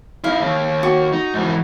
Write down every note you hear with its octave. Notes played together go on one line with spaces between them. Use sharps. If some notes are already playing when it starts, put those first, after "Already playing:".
D#4 E4 F5
D#2
F#4
D#4
G#2 E3